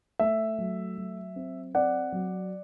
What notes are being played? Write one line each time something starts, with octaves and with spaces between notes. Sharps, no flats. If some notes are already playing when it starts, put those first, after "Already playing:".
A3 E5
F#3
F#3
C4
C4 D5 F#5
F#3